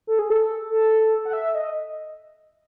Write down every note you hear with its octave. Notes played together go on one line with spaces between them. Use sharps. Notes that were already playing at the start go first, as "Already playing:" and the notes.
A4
G#4
A4
A4
F#5
E5
D#5